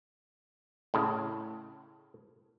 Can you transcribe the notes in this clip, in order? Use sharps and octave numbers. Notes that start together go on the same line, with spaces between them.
A2 C#3